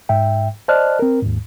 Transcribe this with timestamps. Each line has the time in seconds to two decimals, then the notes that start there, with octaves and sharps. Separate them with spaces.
0.09 G#2 E5 G5
0.68 C5 D5 D#5 A5 F6 F#6
0.99 C4 A#4
1.22 D#2 G#2